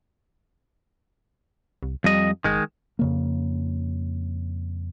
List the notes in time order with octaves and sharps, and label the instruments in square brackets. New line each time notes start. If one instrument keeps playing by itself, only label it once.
[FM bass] C2
[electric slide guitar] F2 D#5 [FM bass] G3
[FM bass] F#1 [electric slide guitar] D#3 G#3
[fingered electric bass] F2 C#3 A#3